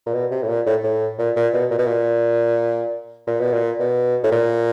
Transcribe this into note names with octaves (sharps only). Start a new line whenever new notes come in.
A#2
B2
C3
A2
A#2
A2
A2
A#2
A#2
B2
A#2
B2
A#2
A#2
B2
A#2
B2
A2
A#2